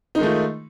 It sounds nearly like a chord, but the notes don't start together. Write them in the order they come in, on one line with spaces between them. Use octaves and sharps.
D#4 G#3 D#3 A3 F4